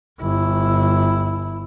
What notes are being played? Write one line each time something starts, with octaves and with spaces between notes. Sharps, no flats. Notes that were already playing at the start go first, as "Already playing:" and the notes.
G1 E4